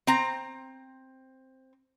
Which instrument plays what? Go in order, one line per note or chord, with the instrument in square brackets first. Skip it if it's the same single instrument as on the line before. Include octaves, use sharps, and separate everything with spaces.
[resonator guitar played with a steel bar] C4 A#5